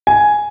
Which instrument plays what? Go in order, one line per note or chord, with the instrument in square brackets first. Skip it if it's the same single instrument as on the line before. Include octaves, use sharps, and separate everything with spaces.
[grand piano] G#5